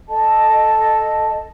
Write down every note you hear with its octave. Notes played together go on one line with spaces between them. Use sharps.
A4 D#5 A5